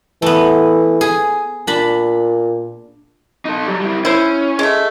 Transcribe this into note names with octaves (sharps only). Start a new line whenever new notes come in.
E3 A3 B3
G#4
A#2 D4 B5
D#4 A4
F#3 G3
G3 E4
C#4 E4 C5
G#3 A3